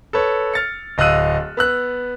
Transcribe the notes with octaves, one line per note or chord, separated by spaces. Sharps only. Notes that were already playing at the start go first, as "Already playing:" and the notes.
A4 B4 C#5
F6 A6 C#7
D1 D#5 F5 E6 F#6 D#7
B3 E6 F#6